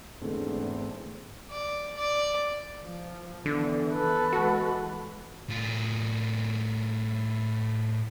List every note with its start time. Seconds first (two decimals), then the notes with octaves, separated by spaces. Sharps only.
0.22 E2 G#2 D3 A3 C4
1.50 D5
1.97 D5
2.83 F3
3.46 D3 E3 B3
3.93 A4 B4
4.33 E3 G#3 F#4
5.50 A2 F4